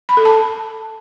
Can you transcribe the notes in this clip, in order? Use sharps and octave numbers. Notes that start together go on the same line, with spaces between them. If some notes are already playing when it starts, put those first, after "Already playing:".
B5
A4
A5